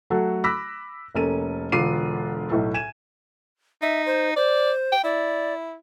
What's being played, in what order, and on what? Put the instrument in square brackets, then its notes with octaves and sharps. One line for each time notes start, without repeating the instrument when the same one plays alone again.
[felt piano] F#3 A3 F#4 A4
B5 D6 E6 F#6 A#6 B6
F1 A#3 C#4 A4 D#7
E1 D3 F4 D6 C7 D#7
B1 A2 A4
G#5 G#6 D#7 E7
[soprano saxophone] D#4 [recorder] E5
[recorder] C5
[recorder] C5 [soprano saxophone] D5
[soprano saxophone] G5
[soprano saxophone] E4 [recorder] D5